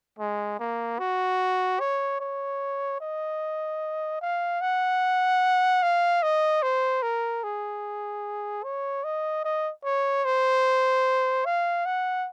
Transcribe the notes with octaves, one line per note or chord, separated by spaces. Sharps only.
G#3
A#3
F#4
C#5
C#5
D#5
F5
F#5
F5
D#5
C5
A#4
G#4
C#5
D#5
D#5
C#5
C5
F5
F#5